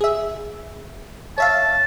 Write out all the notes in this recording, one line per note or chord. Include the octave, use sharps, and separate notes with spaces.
G#4 E5
C#5 E5 F5 A5